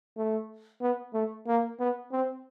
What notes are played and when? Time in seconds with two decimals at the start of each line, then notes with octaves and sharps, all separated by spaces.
0.17 A3
0.81 B3
1.14 A3
1.47 A#3
1.80 B3
2.12 C4